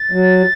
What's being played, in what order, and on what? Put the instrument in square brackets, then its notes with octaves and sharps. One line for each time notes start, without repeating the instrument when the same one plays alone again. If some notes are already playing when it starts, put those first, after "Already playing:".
Already playing: [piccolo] A6
[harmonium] F#3